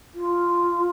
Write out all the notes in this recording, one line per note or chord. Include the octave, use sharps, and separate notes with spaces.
F4